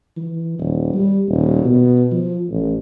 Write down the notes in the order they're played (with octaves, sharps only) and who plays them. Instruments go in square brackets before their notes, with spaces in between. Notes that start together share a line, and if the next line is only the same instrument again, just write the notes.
[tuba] E3
D#1
G3
D#1
B2
F3
A1